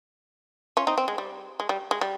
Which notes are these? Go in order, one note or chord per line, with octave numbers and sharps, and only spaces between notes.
C#4 F4
C4 D#4
C4
G#3
G3
G#3
G3
G#3
G3